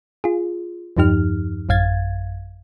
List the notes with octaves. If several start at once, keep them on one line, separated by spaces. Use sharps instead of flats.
F4 G#4
E2 G2 F3 D#4 G4 F6
A1 F#2 F5 G#6 A6